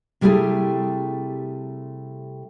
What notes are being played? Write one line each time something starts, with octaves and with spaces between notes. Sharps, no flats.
C3 G3 A3 E4 G4 G#4